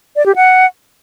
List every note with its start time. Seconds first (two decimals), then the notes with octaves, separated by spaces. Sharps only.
0.16 D5
0.26 G4
0.36 F#5